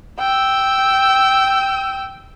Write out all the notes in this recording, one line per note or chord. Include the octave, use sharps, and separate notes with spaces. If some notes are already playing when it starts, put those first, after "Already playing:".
G5 E6